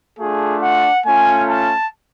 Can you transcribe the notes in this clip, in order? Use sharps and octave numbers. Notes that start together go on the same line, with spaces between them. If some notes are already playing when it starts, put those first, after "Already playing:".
A3 D4 F4 G#4
F#5
A3 C#4 F4 G#5
A5